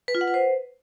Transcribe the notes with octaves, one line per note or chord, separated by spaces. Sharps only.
B4
F4
F#5
B4
C5